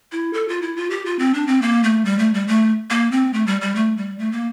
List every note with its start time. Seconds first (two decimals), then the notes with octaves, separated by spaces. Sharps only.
0.12 E4
0.33 A4
0.48 F4
0.62 E4
0.77 F4
0.90 G4
1.06 F4
1.19 C4
1.34 D4
1.47 C4
1.62 A#3
1.84 A3
2.05 G3
2.19 A3
2.34 G3
2.48 A3
2.90 A#3
3.11 C4
3.33 A3
3.47 G3
3.61 G3
3.75 A3
3.97 G3
4.19 A3
4.32 A#3